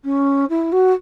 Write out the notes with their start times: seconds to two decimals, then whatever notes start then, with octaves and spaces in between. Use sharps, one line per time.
0.04 C#4
0.50 E4
0.72 F#4